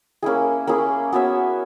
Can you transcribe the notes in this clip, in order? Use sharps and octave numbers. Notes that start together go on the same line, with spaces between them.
A#3 C#4 E4 G#4
A#3 C#4 E4 G#4
B3 F#4 C#5 E5